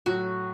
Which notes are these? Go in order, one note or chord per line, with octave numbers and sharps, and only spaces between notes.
A2 F#3 A3 F#4